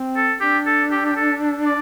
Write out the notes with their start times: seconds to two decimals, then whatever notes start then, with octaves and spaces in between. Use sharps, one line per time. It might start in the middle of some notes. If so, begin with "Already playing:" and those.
Already playing: C4
0.16 A4
0.41 D4 G4
0.66 A4
0.91 G4
1.05 G4
1.16 A4
1.66 D5